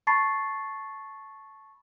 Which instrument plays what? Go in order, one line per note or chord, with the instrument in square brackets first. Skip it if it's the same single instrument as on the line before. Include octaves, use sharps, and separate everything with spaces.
[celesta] A5 B5 C#6 A6 C7